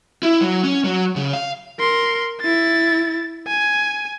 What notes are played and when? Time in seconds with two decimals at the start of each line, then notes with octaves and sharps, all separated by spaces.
0.23 E4
0.41 F#3
0.64 C#4
0.84 F#3
1.16 C#3
1.33 F5
1.79 A#4 C6
2.41 E4 A6
3.48 G#5